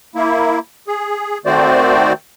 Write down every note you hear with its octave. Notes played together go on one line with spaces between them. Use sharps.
A#3 E4
G#4
D#3 A3 C4 F#4 C5 D5